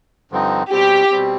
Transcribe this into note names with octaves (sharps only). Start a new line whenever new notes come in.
G2 D3 F3 C4 D#4
B2 G3 C4 G4
B2 G3 C4